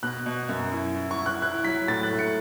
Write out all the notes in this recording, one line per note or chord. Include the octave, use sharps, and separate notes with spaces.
B2 F#6
B2
F#2
E4
E4
C#6
E4
F#6
E4 F#6
F#3 B6
A2 A6
F#6
A3
C#7